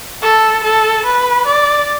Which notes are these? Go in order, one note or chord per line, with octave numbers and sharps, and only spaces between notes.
A4
A4
B4
D5